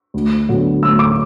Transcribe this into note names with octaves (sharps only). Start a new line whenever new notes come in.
D2
D3 F#3 B3
D2 E6
D6